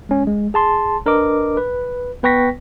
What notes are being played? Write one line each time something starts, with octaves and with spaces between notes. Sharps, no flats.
G#3 C#4
G#3
G#4 A5 C6
D4 A#4 B4 D#5 D6
B4
B3 B4 G5 C#6 A#6 B6